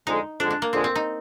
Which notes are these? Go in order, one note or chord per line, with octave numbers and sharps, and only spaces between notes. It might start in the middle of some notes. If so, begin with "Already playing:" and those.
F2 D3 G#3 D#4
F2 D3 G#3 D4
D4
A#3
F2 D3 G#3 C4
C4
D#4